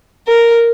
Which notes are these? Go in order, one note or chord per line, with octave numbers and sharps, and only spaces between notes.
A#4